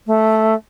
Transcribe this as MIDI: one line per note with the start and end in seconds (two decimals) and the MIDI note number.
0.07 0.55 57